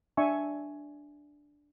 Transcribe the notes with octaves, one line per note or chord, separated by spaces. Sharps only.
D4 E5 G#5 C#6